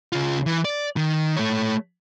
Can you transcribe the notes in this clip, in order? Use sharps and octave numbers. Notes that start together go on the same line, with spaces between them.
C#3 F4
E3
D5
D#3
A3 C#5